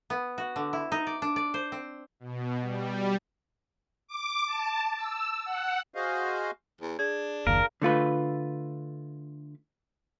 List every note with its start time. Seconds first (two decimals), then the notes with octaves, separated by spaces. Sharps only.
0.10 B3
0.38 F#4
0.56 D3
0.73 E4
0.92 D#4
1.07 D5
1.22 D4
1.36 D5
1.54 C5
1.72 C4
2.20 B2
2.61 G3
4.08 D6
4.46 A5
4.97 E6
5.45 F#5
5.94 F#4 G#4 C5 D#5 F5
6.81 E2
6.99 D4 G#4 G#6
7.47 F#1 D#2 A#4 F5 A#5
7.82 D3 A3 F4 B4